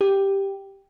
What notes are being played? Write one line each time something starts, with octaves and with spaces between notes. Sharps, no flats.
G4